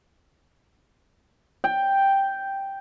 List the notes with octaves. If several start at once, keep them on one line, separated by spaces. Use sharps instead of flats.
G5